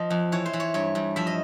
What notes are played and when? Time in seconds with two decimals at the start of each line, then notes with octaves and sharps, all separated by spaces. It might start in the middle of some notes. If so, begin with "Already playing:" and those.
Already playing: F3 D#5
0.10 F2
0.32 E3 C#5
0.46 C5
0.53 E3
0.60 C#5
0.74 G2 C#5
0.95 G2
1.16 F3 E5
1.27 D#5